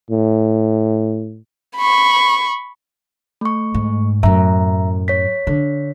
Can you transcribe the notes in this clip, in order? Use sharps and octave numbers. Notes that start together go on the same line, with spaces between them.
A2
B5 C#6
A3 C#6
G#2
F#2 A2 E5 A#5
C#5 B6
D3